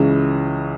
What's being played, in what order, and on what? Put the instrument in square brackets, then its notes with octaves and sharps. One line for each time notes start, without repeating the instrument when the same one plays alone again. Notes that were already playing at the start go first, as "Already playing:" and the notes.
Already playing: [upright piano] C#2 C#3 E3 C#4